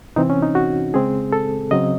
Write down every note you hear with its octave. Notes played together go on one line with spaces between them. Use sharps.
C3 E3 C4 D#4
C#4
D#4
F#4
C#3 G#3 C4 G#4
A4
C#3 F#3 C4 D#5